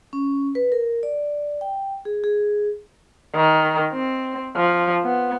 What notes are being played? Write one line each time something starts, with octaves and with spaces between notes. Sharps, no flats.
C#4
B4
A#4
D5
G5
G#4
G#4
D#3
C4
F3
B3